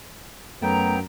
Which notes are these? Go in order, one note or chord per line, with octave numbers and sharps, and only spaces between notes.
F#2 F#3 A3 B3 G5 A#5